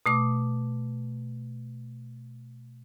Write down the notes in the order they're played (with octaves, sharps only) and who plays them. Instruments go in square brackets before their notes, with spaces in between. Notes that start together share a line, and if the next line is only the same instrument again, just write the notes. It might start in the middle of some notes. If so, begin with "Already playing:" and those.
[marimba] B2 A3 D6